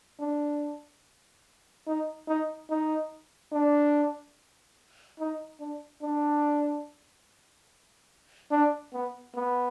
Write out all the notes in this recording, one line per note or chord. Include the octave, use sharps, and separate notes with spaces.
D4
D#4
D#4
D#4
D4
D#4
D4
D4
D4
B3
B3